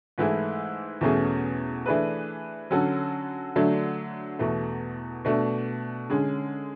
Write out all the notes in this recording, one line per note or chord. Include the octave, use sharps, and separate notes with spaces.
G#2 E3 A3 E4 G#4
E2 B2 A3 C#4 G#4
E3 A3 D4 G#4 B4
D3 F#3 C#4 F#4 A4
D3 F#3 A3 D4
E2 B2 A3
B2 A3 D4
D3 G#3 C#4